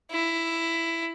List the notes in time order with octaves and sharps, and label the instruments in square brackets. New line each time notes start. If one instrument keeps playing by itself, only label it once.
[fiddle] E4